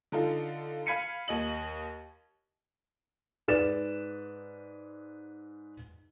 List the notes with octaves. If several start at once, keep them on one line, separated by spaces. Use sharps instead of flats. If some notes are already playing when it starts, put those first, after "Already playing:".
D3 D#4 F4 A4
F5 B5 G#6 B6 C#7 D#7
D#2 D#5 F#7
G#2 G#4 B4 D5 A6 E7